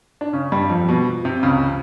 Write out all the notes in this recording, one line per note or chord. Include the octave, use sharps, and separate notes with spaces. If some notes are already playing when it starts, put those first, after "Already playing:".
D4
C#3 C#4
G2 G3
F2 F3
B2
C3
C#2 C#3